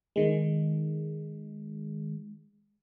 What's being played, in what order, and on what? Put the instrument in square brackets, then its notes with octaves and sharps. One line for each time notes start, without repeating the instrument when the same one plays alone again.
[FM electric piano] D#3 G#3